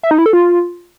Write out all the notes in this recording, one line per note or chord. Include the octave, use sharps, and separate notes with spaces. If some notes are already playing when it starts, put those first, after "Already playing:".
E5
D#4
E4
A4
F4